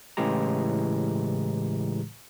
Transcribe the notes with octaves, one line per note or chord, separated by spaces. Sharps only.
A2 C#3 E3 G#3 G4 A#5